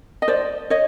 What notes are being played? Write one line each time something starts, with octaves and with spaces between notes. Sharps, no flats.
D#5
C5 D5
C#5 D#5